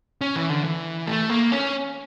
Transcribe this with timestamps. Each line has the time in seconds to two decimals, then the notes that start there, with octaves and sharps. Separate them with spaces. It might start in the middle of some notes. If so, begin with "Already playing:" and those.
0.21 C#4
0.36 E3
0.50 D3
0.64 E3
1.07 A3
1.29 A#3
1.52 C#4